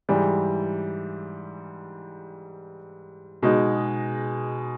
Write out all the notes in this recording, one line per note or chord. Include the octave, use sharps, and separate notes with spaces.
G#2 E3 G3
B2 G#3 D#4